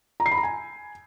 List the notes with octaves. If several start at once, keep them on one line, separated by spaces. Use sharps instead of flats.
A#5
C7
B5
A#5
G#5